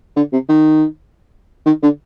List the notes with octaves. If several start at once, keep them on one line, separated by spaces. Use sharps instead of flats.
D3
C3
D#3
D#3
D3